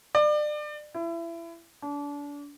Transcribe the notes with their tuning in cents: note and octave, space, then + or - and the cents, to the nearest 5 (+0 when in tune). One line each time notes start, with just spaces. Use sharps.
D5 +30
E4 +30
D4 -30